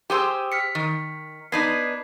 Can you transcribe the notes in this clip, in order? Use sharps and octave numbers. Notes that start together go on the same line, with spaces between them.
G4 G#4 C5 G5 E6
F6 B6 C#7
D#3
B3 D4 D#4 G#6 B6 C7